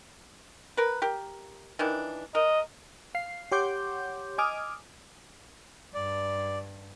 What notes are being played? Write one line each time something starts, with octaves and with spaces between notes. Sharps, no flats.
A#4 B4
G4 A#4
D#3 E3 D4
A#4 D#5
F5 C7
G4 C#5 F#5 C6 D6 G6
D#5 G#5 D6 D#6 F6
G2 D5